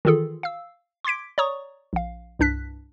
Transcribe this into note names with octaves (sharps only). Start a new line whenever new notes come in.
D#3 E3 F4 G#4 A4
F5 E6
C6 D6 G#6 B6 D7
C#5 D5 A#5 C#6 D#6
A#1 F5
C2 G2 D4 F#6 B6